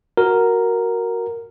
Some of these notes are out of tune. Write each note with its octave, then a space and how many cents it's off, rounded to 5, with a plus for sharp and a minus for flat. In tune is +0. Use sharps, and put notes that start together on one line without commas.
F#4 +0 A#4 +0